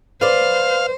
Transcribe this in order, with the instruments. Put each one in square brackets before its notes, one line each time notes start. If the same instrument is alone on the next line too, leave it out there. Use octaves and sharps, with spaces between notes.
[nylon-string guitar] B4 D5 [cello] C5 [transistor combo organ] F5